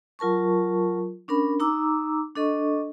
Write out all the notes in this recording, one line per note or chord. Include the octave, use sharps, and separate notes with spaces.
F#3 F4 A#4 A5 C#6
C#4 D4 A#4 B5
D#4 A#5 D6 E6
D4 A4 D#5 C#6